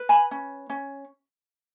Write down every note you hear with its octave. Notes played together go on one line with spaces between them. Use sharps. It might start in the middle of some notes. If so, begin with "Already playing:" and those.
Already playing: B4
G#5 B5
C#4
C#4